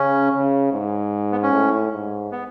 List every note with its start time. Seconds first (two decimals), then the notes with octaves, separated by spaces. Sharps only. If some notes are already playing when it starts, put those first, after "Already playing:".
Already playing: C#3 C#4
0.32 C#3
0.72 G#2
1.32 B3
1.42 C#4
1.52 A2
1.92 G#2
2.32 B3